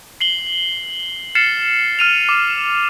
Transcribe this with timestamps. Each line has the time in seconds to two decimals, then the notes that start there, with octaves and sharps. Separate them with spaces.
0.21 C7 F#7 G7
1.35 F6 A6 C7 C#7 E7
1.99 F6 D#7 F7
2.29 D6